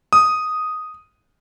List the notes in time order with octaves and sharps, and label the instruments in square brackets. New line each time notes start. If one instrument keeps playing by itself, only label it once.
[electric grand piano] D#6